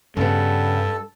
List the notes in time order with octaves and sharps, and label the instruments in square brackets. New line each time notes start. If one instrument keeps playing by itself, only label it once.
[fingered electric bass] G2 [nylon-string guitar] C#3 B3 [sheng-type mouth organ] A4